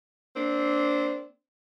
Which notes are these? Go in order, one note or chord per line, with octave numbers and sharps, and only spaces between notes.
A#3 C4 D4